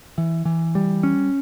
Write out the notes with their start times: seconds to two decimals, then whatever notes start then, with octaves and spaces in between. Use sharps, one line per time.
0.18 E3
0.45 E3
0.75 G3
1.03 C#4